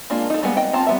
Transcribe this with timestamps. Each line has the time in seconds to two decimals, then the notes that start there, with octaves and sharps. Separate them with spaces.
0.10 G#3 A#3 D4 F4
0.30 D#4 A4
0.43 G3 G#3 A#3 B3
0.57 D#5 G5
0.73 C4 F4 A5 A#5
0.87 G3 B3 E5